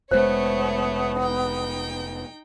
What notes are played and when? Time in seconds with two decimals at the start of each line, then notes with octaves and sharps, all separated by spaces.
0.11 F1 G#3 A3 B3 C5 C#5
1.21 D#4 G5